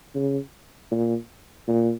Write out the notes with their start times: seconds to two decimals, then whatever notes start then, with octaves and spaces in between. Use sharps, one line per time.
0.15 C#3
0.91 A#2
1.68 A#2